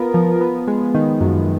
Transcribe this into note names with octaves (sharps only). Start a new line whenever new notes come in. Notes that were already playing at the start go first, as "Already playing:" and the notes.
Already playing: B3 F4 A#4
F3
B3
G#3
D#3
F#2